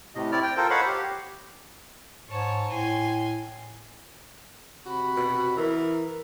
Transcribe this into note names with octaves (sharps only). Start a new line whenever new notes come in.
A2 C3 D#5
C4 E4 D5 F6
G5
F4 A4 A#4 C5
C5 C#5 D#5 F5 F#5 B5
G4
G#2 C#5 A5
A2 G#5 C6
C3 F#4 B5
B2
E3 A#4